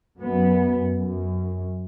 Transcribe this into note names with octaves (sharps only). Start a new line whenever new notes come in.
F#2 B3
F#2